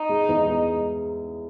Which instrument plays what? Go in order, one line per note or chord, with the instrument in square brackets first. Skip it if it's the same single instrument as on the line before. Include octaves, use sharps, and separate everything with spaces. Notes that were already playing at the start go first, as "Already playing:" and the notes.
Already playing: [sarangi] D#4
[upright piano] G#3
E2
G#3